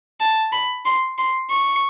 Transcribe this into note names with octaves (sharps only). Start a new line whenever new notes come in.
A5
B5
C6
C6
C#6